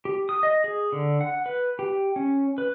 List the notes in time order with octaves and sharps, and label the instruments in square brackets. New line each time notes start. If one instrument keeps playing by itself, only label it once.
[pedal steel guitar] G4
D#6
D#5
G#4
D3
F#5
B4
G4
C#4
B4